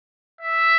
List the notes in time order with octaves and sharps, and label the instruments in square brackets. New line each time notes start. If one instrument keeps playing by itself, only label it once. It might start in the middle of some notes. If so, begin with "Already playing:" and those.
[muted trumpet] E5